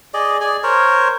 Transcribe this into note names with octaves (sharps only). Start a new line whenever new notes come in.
G#4 D5 D#5
G#4 D5 G#5
A#4 C5 C#5